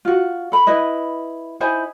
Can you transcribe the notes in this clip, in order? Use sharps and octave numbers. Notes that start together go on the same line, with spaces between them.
F4 F#4
A4 B5
E4 B4 D#5
D#4 E4 C5 G#5